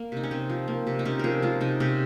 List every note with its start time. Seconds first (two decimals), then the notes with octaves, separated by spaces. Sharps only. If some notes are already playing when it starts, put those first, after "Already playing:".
Already playing: A#3
0.12 C3 D#4
0.23 C#4
0.31 C3 C4
0.50 F3
0.68 A#3
0.87 C3
0.99 D#4
1.05 C3 C#4
1.19 F3 G#4 A#4
1.42 G#3 F4
1.60 C3 D#4
1.80 C3 C#4